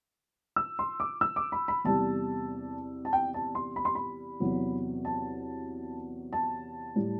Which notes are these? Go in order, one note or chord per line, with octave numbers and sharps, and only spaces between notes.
E6
C6
D6
E6
D6
B5
B5
E2 C3 G3 A5
A5
G5
A5
C6
B5
C6
B5
E2 C3 F#3
A5
A5
A2 G3